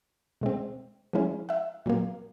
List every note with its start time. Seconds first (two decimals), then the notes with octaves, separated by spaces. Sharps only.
0.41 B2 G#3 C4
1.13 F3 G#3 C#4 E4
1.49 E5 F#5
1.86 A#2 F#3 A#3